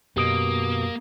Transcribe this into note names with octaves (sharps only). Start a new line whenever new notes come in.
F#2 B2 A#3 G4 D#6 D7